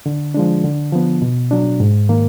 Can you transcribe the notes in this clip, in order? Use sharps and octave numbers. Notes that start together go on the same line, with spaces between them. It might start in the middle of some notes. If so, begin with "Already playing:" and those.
D3
F3 G#3 D4
D3
F3 B3
B2
F#3 D4
G#2
D#3 A#3